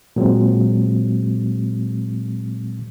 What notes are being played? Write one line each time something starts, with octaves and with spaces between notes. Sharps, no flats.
A#2 F#3 G#3 C4